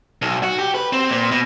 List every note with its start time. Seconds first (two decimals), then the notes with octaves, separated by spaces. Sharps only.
0.22 B1
0.43 F#4
0.59 G4
0.75 B4
0.93 C4
1.10 A#2
1.31 B2